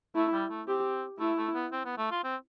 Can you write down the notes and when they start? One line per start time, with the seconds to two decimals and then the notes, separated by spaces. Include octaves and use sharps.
0.15 A3 E4
0.33 G3
0.50 A3
0.67 C4 G4
1.19 A3 E4
1.37 A3
1.54 B3
1.72 C4
1.85 B3
1.98 A3
2.11 F4
2.24 C4